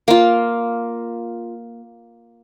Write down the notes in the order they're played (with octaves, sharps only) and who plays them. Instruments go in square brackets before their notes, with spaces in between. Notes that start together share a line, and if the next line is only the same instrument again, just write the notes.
[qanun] A#3 F4